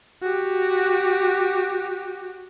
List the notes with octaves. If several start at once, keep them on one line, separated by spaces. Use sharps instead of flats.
F#4 G4